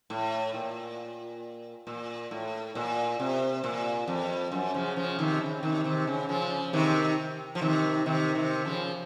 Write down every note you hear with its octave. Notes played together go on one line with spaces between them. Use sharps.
A2
A#2
A#2
A2
A#2
C3
A#2
F2
F#2
C#3 F3
C#3 F3
C3 D#3
C#3
C3 D#3
C3 D#3
C#3
C#3 F3
C3 D#3
F3
C3 D#3
C3 D#3
C3 D#3
C#3 F3